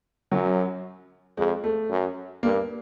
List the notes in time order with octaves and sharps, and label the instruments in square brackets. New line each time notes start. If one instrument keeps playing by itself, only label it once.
[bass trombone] F#2 [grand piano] F#3
[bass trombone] F2 [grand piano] G#3
[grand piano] A3
[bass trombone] F#2
[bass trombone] G2 [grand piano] A#3